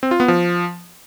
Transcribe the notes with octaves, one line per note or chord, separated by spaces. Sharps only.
C4
F4
B3
F3